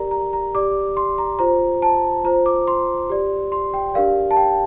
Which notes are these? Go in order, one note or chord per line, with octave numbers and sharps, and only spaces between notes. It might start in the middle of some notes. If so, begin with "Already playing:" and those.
Already playing: G4 A#4 D5 A#5
A#5
A#5
G4 D5 D6
C6
A#5
F4 C5 A#5
A5
F4 C5 A#5
D6
C6
G4 D5
C6
G5
D4 G4 A#4 D5 F5
A5
G5